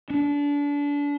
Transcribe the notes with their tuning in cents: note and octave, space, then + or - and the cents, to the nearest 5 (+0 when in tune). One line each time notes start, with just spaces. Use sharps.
D4 -30